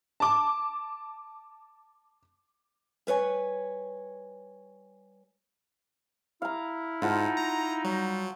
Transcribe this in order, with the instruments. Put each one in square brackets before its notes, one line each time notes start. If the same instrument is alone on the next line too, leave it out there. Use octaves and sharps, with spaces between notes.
[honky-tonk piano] A5 D6
[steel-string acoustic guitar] G3 B4 C#5 G#5
[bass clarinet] E4 [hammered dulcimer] F5 A#5
[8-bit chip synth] G#2 [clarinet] D#4 [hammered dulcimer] F4 F#5 A5
[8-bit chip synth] A#5
[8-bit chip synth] F#3 [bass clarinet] G3